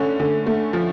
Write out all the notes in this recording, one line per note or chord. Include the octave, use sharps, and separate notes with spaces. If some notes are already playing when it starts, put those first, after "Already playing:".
Already playing: D3 A3 C#4
D3
A3
F3